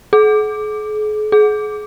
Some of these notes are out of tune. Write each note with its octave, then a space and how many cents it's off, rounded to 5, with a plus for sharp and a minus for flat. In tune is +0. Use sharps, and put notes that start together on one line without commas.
G#4 +45
G#4 +30